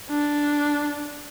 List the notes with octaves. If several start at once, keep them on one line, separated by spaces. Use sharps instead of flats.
D4